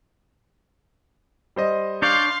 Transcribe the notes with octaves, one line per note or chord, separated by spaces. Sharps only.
G3 C5 D#5
D4 C#5 D5 F5 C6 G6